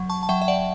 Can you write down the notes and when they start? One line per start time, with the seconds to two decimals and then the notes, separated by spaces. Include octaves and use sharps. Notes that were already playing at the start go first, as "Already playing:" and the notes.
Already playing: F#3
0.10 A5 C#6
0.23 A5
0.29 F#3 E5 G5
0.42 E5
0.48 D5 F#5